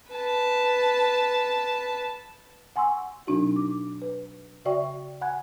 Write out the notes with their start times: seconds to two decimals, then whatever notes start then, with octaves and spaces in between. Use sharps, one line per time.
0.11 B4 A5
2.76 F#5 G#5 C6 C#6 E6
3.27 B2 F#3 C4 D4 D#4 F#4
3.56 D6
4.02 B4
4.65 C#3 F#4 D5 E5 G5 C#6
5.21 F#5 G#5 B5 F#6 G#6